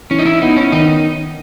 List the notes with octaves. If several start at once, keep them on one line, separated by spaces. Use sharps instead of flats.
E3 C#4
D#4
E4
B3 D#4 E4
C#4
D#3 D#4